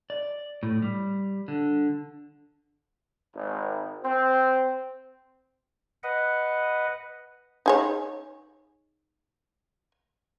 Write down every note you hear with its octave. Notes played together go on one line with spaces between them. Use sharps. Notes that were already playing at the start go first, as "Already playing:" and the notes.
D5
A2
G3
D3
G#1
C4
B4 D#5 F#5
D#4 G#4 C#5